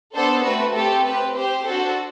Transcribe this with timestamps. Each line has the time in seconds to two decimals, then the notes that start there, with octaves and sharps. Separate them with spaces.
0.14 B3 D4 A4 C5
0.43 A3 C4 F#4 B4
0.74 A3 C4 G4 A4
1.03 C4 G4 B4
1.34 C4 G4 C5
1.64 D4 F#4 A4